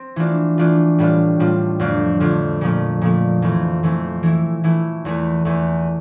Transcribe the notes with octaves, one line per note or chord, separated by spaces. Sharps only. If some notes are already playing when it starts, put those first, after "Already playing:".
Already playing: C4
E3 A3 D4 F4
E3 A3 D4 F4
A2 G3 D4 F4
A2 G3 D4 F4
F2 D3 A3 D4 F4
F2 D3 A3 D4 F4
A#2 F3 A3
A#2 F3 A3
F2 E3 A3 C4
F2 E3 A3 C4
E3 A3 E4
E3 A3 E4
E2 E3 A3
E2 E3 A3